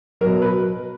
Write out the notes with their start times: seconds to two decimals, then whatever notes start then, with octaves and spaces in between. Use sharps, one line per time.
0.21 F#3 A#4
0.26 B2
0.42 B4